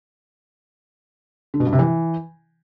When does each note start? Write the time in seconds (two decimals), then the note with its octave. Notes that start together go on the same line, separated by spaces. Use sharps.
1.54 D3
1.60 B2
1.66 G2
1.73 C3
1.79 E3